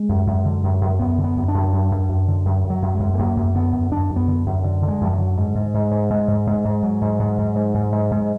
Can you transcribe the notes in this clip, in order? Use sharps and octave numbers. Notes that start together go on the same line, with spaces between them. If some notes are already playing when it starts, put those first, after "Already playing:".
Already playing: G#3
F#2
F#2
D3
F#2
F#2
F#2 B3
D3
B3
F#2
D4
F#2
F#2
F#2
F#2
D3
F#2
F#2
F#3
F#2
F#2 G#3
G#3
F#2 A#3
F#2
D3 B3
F#2
F#2 D4
F#2
B3
D3
F#2
D3
D3
G#3
F#2 F3
F#3
D3
G#2
G#2
G#2
G#2
G#2
G#2
G#2
G#2
G#2 F#3
G#2
G#2
G#2
G#2
G#2
G#2
G#2